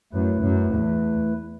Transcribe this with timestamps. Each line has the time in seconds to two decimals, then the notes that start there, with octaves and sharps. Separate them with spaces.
0.13 F#2 A3 E4 B4
0.43 F#2
0.74 E2